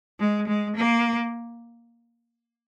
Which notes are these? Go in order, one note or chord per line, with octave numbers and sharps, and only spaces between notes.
G#3
G#3
A#3